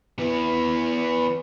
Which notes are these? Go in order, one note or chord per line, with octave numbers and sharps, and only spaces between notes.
E3 B3